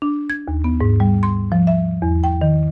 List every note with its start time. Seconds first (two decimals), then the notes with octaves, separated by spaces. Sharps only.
0.02 D4
0.30 G#6
0.48 D#2
0.64 B3
0.81 G#2
1.00 G3
1.23 C6
1.52 F3
1.67 E5
2.02 E2
2.24 G5
2.41 D#3